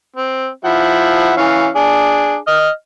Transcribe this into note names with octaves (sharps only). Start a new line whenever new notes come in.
C4
F3 E4 F#5
E3 C#4 F5
D4 G#4
D#5 F6